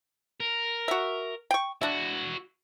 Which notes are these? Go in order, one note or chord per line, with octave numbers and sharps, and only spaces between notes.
A#4
F#4 E5
G5 C#6
D4 E4 F#4 E5